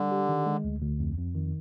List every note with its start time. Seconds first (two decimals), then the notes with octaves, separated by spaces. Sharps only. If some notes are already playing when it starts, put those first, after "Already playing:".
Already playing: D3 G3
0.12 G4
0.29 D#3
0.46 G#3
0.64 D2
0.82 D2
1.00 F2
1.17 F2
1.35 D#3